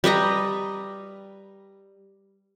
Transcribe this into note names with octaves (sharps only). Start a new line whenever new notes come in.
G3 B4 D#5 A#5